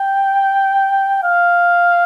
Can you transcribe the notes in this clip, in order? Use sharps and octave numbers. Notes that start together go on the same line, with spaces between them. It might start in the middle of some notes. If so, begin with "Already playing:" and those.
Already playing: G5
F5